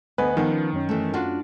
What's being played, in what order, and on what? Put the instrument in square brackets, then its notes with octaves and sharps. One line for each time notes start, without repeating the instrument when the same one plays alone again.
[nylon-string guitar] D2 B3 [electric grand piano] B4 [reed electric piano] D#5 F#5 G#5
[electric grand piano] D#3 [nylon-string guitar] F3 B3
[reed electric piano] C#4
F#2 C#4
[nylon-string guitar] E3 A3
D4 F4 F#4